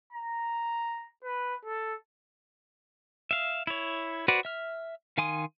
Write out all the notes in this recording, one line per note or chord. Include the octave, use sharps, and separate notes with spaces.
A#5
B4
A4
E5 F5
E4 C#5
F#4 B4 C5 D5
E5 F6
D#3 F5 G#5 C6 D#6